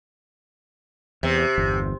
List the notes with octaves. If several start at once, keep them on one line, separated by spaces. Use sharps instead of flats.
E2 C3
G1 E2